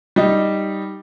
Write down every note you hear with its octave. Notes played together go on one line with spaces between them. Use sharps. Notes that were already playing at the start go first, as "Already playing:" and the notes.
G3 D#4